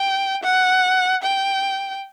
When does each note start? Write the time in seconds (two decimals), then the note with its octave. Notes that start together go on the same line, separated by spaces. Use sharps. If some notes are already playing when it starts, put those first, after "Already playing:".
Already playing: G5
0.44 F#5
1.23 G5